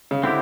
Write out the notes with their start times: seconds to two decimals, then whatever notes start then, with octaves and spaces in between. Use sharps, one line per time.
0.11 C#3
0.23 D3 C4 E4 G4